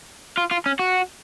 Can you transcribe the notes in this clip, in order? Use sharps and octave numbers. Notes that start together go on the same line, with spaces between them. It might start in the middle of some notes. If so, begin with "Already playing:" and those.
F4
F4
C#4
F#4